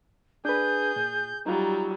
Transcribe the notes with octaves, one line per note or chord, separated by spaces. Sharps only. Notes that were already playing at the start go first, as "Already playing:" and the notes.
D4 G#4 B4 G6
A#2
F#3 G3 D#4 F4 A#5